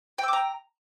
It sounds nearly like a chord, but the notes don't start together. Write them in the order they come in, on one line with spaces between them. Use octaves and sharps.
G5 E6 D6 A#5